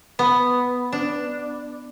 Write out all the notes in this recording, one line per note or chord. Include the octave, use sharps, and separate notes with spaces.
B3
D4